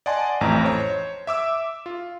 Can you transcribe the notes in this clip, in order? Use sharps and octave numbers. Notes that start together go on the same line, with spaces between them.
D5 D#5 F#5 G#5 A5 C6
A1 F2 A2 A#5
C5 C#5
E5 D6 E6
F4